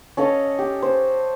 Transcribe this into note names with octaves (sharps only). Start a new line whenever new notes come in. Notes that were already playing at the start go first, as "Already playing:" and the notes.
C#4 A4 D#5 F5
G4
C5